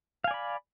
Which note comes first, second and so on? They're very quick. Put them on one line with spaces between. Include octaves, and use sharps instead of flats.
F5 G#5 D5 B5